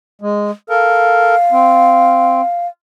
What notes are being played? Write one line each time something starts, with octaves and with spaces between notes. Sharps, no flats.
G#3
A4 A#4 F5
C4